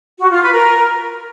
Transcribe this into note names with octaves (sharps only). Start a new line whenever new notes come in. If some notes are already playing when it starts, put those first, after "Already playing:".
F#4
F4
B4
A#4